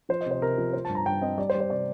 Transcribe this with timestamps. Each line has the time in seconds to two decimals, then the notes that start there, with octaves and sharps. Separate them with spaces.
0.09 F3 C5
0.21 D#5
0.26 C3
0.31 C5
0.41 C3 A#4
0.58 F3
0.73 F3 C5
0.85 G2 A5
0.95 A#5
1.06 G2 G5
1.22 C4 D#5
1.38 G3 D5
1.50 C5
1.55 G3
1.60 C5
1.70 C3 D5